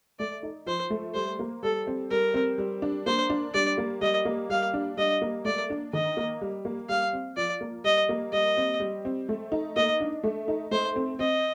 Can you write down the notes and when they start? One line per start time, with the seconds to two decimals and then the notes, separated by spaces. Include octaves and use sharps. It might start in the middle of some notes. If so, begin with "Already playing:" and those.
0.19 A3 D5
0.43 D#4
0.66 F3 C5
0.90 A3
1.14 G3 C5
1.39 A#3
1.63 G3 A4
1.87 C4
2.10 G3 A#4
2.34 C4
2.58 G3
2.82 D4
3.06 A#3 C5
3.30 D4
3.54 G3 D5
3.78 A#3
4.01 G3 D#5
4.25 A#3
4.50 G3 F5
4.74 D4
4.97 G3 D#5
5.22 A#3
5.45 A3 D5
5.70 D4
5.93 D#3 D#5
6.17 A#3
6.41 G3
6.65 A#3
6.89 G3 F5
7.13 C4
7.37 F3 D5
7.61 A#3
7.84 G3 D#5
8.09 A#3
8.33 G3 D#5
8.57 C4
8.80 G3
9.05 C4
9.29 A3
9.52 D#4
9.76 A#3 D#5
10.00 D4
10.24 A3
10.48 D#4
10.71 A3 C5
10.96 C4
11.19 C4 D#5